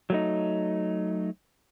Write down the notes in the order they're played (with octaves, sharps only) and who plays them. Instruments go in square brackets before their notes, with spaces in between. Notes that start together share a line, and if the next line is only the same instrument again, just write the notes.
[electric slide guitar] F#3 A3 D#4